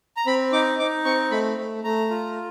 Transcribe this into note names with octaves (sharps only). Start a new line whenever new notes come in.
A#5
C4 B5
D#4 D6
D#4 D6
C4 C#6
A3 B5
A3
A3 A#5
F4